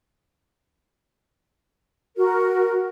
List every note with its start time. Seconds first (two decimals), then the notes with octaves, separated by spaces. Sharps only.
2.16 F#4 A#4